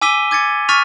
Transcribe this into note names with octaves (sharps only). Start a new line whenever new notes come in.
G#5 D6 E6 B6 D#7 G7
D6 G#6 A6 C#7
C#6 F6 A6 B6 D#7 F7